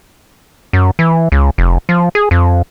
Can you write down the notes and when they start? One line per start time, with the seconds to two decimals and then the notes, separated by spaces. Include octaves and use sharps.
0.73 F#2
0.99 E3
1.32 C#2
1.58 F1
1.89 F3
2.15 G#4
2.31 F2